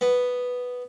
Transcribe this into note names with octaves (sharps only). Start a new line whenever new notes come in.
B3